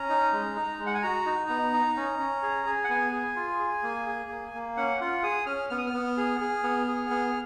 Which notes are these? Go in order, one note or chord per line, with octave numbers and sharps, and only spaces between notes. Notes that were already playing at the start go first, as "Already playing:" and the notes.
Already playing: C#4 A#5
D#4
G#3
D#4
G#3
F#5
G#5
F#4 A#5
D#4
B3
D#4
C#4
C#4
G#4
G#4
F#5
B3 G#5
G#4
F4
G#4
A#3
G#4
A#3
A#3
C#4 F#5
F4 F#5
G#4 D#6
C#4 F6
B3 F6
D#6
F6
B3
G#4
G#4
B3
G#4
B3